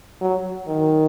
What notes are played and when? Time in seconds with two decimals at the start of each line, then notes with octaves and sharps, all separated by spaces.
0.21 F#3
0.68 D#3